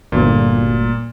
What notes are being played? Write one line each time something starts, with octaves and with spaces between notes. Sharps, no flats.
G1 D2 A#2